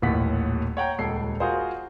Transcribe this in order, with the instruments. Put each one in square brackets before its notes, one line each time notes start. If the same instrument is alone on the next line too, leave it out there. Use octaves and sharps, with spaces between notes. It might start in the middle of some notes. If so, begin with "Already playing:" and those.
[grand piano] D#1 A1 D#2 F#5 B6
C#5 F#5 G5 A#5
D#1 C#2 A4 C7
F4 F#4 G#4 A#4 C5